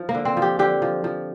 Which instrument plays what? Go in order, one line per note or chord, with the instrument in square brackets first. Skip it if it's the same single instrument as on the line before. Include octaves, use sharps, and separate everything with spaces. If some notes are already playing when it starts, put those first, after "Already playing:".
Already playing: [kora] F3
A#3
D3
C4
F3
G4
D3 G4
F3
F3